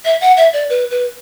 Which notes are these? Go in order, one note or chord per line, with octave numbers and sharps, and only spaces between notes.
E5
F#5
E5
D5
B4
B4